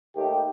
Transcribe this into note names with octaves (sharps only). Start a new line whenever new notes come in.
D#2 D#3 A3 G4